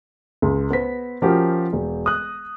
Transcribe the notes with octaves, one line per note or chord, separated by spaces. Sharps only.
C#2
B3 C5 B6
F3 C#4 F#4 G4 A#4
E1
D#6 F#6